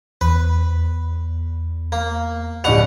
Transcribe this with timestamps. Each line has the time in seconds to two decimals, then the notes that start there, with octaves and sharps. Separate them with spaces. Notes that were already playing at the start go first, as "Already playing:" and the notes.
0.21 E2 B4
1.92 A#3
2.64 D1 B2 D5 F#5 F7